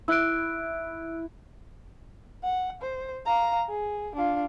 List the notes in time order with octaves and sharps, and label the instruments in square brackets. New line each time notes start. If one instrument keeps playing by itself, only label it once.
[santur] E4 [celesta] E6 F#6 D7
[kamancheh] F#5
C5
F5 A#5
G#4
D4 F4